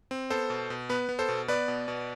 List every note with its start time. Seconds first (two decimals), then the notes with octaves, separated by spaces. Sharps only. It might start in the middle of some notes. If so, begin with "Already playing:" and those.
0.11 C4
0.30 B3 A4 C5
0.50 B2
0.70 B2
0.89 B3 B4
1.09 B3
1.19 A4 C5
1.29 B2
1.48 B3 B4 D5
1.68 B2
1.88 B2